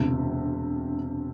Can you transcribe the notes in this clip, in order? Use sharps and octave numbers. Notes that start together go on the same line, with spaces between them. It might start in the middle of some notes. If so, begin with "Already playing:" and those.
Already playing: E1 D2 C3